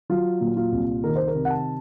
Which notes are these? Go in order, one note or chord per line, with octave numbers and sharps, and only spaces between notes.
F#3 F4
A#2
F4
C2
D#3 A#4
C5
A#4
C3
F#5
A5